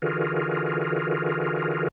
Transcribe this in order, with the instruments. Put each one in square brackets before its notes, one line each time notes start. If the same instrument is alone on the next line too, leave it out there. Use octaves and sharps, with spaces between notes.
[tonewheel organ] D3 E3 F4 F#4 G#4 A#4